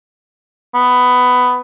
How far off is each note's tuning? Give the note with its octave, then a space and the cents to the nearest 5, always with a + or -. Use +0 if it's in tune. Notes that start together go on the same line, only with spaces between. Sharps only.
B3 +10